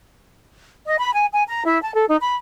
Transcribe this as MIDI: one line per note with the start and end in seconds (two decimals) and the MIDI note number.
0.86 0.96 75
0.99 1.13 83
1.14 1.26 80
1.33 1.43 80
1.48 1.63 82
1.65 1.81 64
1.83 1.94 81
1.95 2.05 69
2.08 2.16 63
2.21 2.35 83